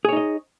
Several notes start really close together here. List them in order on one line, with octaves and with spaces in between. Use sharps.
G#4 C#5 D#4 D#5